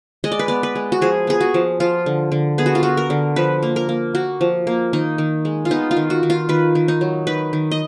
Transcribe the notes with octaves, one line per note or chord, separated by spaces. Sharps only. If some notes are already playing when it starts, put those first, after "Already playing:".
G#3 D#5
D5
B4
B3 D5
B4
G#3
F#4
F3 G#4
B3 G#4
F#4
F3
F3 F4
D3
D3
B3 G#4
F#4
F4
B3 F#4
A#4
D3
F3 B4
A#3
A#4
A#3
A#3 F#4
F3
A#3
D#3 D#4
D#3
G#3
F4
B3 D#4
F4
D#3
F#4
D#3
F4
D#3 B4
D#3
D#4
F#3
D#3 B4
D#3
D#5